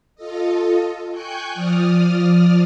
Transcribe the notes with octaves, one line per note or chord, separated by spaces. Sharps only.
F4 A4 D#5
G5 G#5 C#6 F#6 G6
F3 D5 D#6 F6